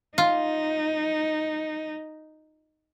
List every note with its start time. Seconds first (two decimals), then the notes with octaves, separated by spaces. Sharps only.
0.18 D#4 F4